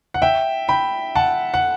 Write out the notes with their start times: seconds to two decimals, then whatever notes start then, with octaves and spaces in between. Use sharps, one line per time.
0.14 F#5
0.22 E5 G5
0.68 G5 B5
1.15 F#5 A5
1.54 F#5